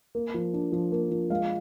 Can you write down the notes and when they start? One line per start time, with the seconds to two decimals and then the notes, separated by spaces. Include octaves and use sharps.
0.15 A#3
0.34 F3
0.54 D4
0.72 F3
0.92 A#3
1.11 F3
1.30 G#3 F5